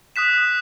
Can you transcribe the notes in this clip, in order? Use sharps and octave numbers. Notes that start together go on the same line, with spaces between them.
D#6 F#6 B6 E7